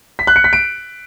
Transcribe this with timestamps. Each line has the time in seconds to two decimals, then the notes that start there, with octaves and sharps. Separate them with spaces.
0.19 B6
0.27 F#6
0.36 C#7
0.44 B6
0.53 D7